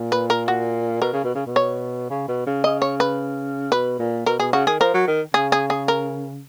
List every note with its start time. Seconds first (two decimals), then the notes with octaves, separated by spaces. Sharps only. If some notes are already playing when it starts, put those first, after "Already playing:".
Already playing: A#2
0.12 B4
0.30 A#4
0.48 F#4
1.02 B2 A#4
1.13 C#3
1.24 B2
1.35 C#3
1.46 B2
1.56 C#5
2.10 C#3
2.28 B2
2.46 C#3
2.64 C#3 D#5
2.82 C#5
3.00 B4
3.72 B2 B4
3.99 A#2
4.26 B2 A#4
4.39 B2 G#4
4.53 C#3 F#4
4.67 D#3 G#4
4.80 F3 A#4
4.94 F#3
5.07 D#3
5.34 C#3 G#4
5.52 G#4
5.70 G#4
5.88 A#4